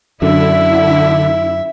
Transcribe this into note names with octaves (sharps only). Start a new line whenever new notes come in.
F#2 D3 E4 E5